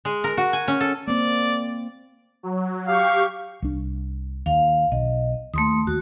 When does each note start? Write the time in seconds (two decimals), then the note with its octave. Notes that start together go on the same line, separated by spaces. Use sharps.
0.05 G#3
0.24 A#4
0.37 F#4
0.53 G#5
0.68 C#4
0.80 A4
1.08 A#3 C4 D5
2.43 F#3
2.88 G4 F5 C#6
3.62 C2 D4
4.46 D#2 F5
4.92 B1 D#5
5.54 D#2 A3 C6 D#6
5.87 D#2 F#4